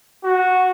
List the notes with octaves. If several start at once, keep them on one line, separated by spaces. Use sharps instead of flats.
F#4